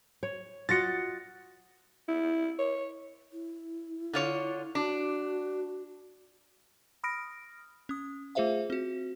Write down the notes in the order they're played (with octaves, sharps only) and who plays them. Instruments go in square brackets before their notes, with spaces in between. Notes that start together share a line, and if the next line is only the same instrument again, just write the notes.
[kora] C#5
[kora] F4 F#4 D#5 [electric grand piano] A6 A#6 C#7
[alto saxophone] E4
C#5
[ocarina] E4
[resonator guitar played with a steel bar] D3 F4 C#5
[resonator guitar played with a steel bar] D4 [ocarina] F#4
[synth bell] B5 D#6 F6 A#6 D7
C#4 D#6
A3 F4 G#4 C5 E5 F5
C4 F#4